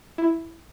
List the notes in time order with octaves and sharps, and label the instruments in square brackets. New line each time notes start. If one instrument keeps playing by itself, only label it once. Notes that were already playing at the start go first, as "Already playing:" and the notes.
[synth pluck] E4